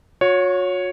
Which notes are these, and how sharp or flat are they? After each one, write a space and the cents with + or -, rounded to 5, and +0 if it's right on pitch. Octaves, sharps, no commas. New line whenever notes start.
F#4 -40 C#5 +0